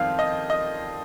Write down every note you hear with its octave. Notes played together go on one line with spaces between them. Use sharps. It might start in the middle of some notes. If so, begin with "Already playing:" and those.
Already playing: F2 D#3 G3 C4 F5
D#5
D#5